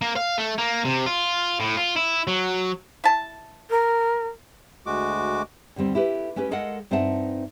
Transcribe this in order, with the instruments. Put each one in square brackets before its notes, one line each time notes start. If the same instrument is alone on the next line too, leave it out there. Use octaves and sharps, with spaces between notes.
[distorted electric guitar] A#3
F5
A3
A#3
C3
F4
A2
F4
E4
F#3
[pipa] E4 A5
[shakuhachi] A#4
[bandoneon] D2 G#3 F#4 D6
[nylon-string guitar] D#2 D3 G3 C4
E4 G4 A4 B4
A3 C#4 G4 B4
G#3 A4 A#4 D#5 F5 F#5
G2 C4 D#4 E5 F#5 A5